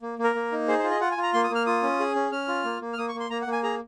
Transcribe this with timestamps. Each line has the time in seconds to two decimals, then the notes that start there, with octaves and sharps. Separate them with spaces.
0.02 A#3
0.19 A#3
0.24 A#4
0.35 A#3
0.52 D#4
0.68 G#4 C5
0.79 C5
0.84 F4
0.90 D#5
1.00 F4 F#5
1.11 G#5
1.17 F4
1.23 A#5
1.34 A#3 C6
1.44 D#6
1.50 A#3
1.55 F6
1.66 F4 D#6
1.83 C#4
2.00 G#4
2.15 C#4
2.31 C#4 F6
2.48 F4
2.64 A#3
2.81 A#3
2.93 F6
2.98 A#3 D#6
3.08 C#6
3.15 A#3
3.20 C6
3.30 A#3 A#5
3.42 F#5
3.47 A#3
3.52 G#5
3.63 G#4 A#5